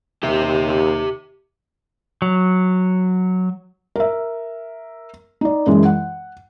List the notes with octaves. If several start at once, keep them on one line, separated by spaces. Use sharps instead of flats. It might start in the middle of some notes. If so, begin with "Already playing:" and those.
D#2 G4 E5
F#3
A#4 E5
D#4 D5
F#2 E3 G#3
F#5